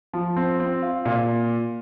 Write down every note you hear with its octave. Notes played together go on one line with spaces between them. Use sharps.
F3
C4
C4
F4
A#2